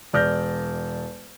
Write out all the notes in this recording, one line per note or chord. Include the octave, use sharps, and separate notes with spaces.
E1 D5 F6 G6 A#6